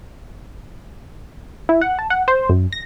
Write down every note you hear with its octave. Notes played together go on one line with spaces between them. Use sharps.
E4
F#5
A5
F#5
C5
F#2
A#6